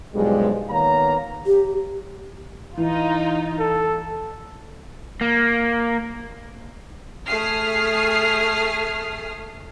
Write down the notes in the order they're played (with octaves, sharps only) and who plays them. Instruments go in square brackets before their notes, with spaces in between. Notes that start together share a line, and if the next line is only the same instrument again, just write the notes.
[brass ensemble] B1 G2 A#2 F3 G3 G#3
D#3 A#3 B3 C#5 F5 A#5
[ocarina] G4
[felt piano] E3 [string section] D#4 F4
[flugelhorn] A4
[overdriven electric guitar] A#3
[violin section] A3 G#4 D#6 F6 C7